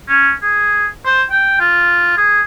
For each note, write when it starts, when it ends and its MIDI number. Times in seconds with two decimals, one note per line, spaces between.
0.08 0.32 61
0.42 0.87 68
1.05 1.22 72
1.31 1.57 79
1.60 2.15 65
2.17 2.42 68